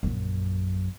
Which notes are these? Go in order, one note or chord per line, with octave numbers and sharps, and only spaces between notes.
A#1 F#2